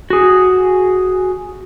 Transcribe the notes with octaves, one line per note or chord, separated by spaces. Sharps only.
F#4 G#4